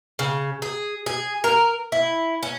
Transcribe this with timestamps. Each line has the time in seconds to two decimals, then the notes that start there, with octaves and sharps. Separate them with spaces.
0.19 C#3
0.62 G#4
1.06 G#4
1.44 A#4
1.92 E4
2.43 C#4